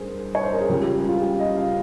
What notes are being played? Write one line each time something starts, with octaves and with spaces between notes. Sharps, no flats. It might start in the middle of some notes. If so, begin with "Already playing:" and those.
Already playing: G2 G#4 A#4 C5
C#5
C5
A#4
G#4
C#2 C#3 G3 G4
G4
G4
F4
G4
D#5
F5